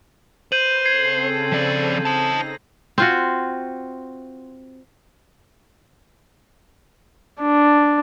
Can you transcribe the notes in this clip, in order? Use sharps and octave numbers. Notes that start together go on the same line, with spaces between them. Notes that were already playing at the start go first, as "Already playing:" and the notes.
B4 C5 G6 D#7 F#7
C#3 C4 A4 G#6 C7
F3 D5
D#4 C5 A5 A#6
C4 F4 F#4
D4